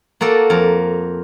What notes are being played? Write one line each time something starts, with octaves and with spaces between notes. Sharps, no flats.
A#3 F#4 A4 D5
F2 A#4